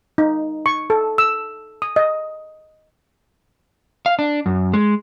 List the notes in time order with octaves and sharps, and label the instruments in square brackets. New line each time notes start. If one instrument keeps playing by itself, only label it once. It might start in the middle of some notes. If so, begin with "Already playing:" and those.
[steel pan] D#4
C#6
A4
E6
D#6
D#5
[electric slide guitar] F5
D4
F#2
G#3